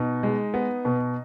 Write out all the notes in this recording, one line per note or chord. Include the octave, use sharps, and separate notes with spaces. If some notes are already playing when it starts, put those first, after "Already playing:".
Already playing: B2 D#4
G#3
B3
B2